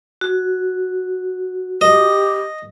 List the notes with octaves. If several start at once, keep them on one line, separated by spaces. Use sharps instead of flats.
F#4
G4 D#5